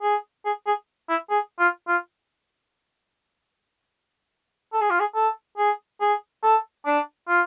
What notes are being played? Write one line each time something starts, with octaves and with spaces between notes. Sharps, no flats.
G#4
G#4
G#4
E4
G#4
F4
F4
A4
G#4
F4
G#4
A4
G#4
G#4
A4
D4
F4